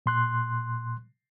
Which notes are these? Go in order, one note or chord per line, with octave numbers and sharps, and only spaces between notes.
A#2 C6 F#6